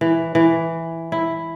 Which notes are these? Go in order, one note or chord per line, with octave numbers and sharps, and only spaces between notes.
E3
E3
E4